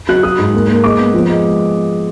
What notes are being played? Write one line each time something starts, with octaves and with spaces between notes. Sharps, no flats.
F#3 F#6
F#3 D#6
G#2
A#3
A#3
G#3 D6
B3
F3
G#3